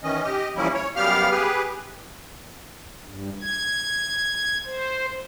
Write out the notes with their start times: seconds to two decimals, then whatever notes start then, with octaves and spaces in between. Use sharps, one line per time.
0.03 D#3 E3 C#4 D#5
0.23 G4 D#5
0.56 E3 F3 G3 A#3 C#4 E4
0.74 C#5
0.96 F#2 G3 B3 G4 F5 F6
1.31 G4 G#4 B4
3.04 G2
3.41 G#6
4.66 C5